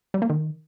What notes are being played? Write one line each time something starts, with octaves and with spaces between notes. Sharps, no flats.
G3
A#3
D#3